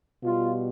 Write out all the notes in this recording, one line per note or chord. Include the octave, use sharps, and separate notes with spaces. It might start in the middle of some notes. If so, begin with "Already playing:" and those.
B2 G3 F4